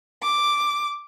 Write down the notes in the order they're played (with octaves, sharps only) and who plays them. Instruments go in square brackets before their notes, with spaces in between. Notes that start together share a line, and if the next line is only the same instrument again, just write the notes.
[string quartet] D6